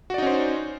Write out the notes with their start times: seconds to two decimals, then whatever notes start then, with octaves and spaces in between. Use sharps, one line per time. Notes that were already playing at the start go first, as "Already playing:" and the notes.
0.10 F#4
0.14 D5
0.18 D#4
0.22 C#4
0.27 C5